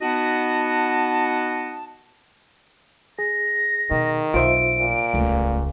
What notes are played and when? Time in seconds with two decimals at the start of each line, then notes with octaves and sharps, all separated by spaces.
0.02 B3 D#4 F#4 D#5 F#5 A5
3.19 G#4 A#6
3.91 B2 D#3
4.34 B1 F4 C5 E5 D7
4.78 A#2
5.13 D#1 C#2 A3